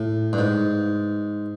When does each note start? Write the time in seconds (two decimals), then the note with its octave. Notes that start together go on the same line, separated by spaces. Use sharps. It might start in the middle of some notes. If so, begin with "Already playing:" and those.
Already playing: A2
0.33 G2
0.39 G#2